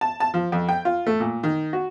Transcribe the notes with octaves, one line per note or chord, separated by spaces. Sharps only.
A5
A5
F3
F2
G5
F4
A3
A#2
D#3
F#4